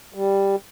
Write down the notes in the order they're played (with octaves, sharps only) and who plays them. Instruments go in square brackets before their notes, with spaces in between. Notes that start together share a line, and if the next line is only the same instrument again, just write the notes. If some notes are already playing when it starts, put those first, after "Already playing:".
[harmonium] G3